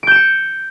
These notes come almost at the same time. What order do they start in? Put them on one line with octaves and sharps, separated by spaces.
D7 G6 E7 C#7